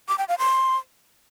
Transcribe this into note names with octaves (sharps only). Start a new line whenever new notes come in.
D6
G5
F5
C6